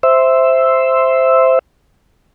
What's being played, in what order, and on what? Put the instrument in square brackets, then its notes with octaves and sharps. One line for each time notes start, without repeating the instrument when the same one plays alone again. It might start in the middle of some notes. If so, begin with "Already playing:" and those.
[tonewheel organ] C5 E5